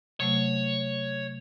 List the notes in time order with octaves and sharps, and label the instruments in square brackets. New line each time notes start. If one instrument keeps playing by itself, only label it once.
[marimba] C3 F#3 A3 [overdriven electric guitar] C#5